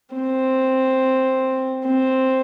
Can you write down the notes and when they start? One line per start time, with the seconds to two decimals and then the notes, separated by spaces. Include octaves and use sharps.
0.16 C4
1.86 C4